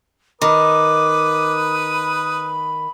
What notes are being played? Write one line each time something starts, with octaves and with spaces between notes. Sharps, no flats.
D#3 B4 D6 D#6
B5